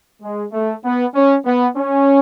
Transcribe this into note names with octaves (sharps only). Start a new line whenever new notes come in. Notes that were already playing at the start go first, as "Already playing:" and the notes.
G#3
A3
B3
C#4
B3
C#4